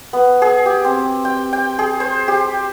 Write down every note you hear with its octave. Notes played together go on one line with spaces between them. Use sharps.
B3
G#4
G4
C4
G5
G5
G#4
C5
G4